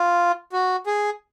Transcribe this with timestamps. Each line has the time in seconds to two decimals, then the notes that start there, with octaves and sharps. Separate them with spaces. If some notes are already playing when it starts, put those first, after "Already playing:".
Already playing: F4
0.53 F#4
0.87 G#4